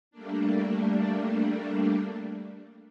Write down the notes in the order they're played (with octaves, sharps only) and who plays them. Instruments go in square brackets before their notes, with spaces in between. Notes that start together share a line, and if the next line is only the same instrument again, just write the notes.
[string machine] G3 A3 A#3 D4